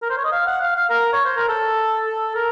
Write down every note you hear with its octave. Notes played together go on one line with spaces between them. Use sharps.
A#4
C5
C#5
D#5
F5
F#5
F5
F5
A#4
C#5
C5
A#4
A4
A4
A#4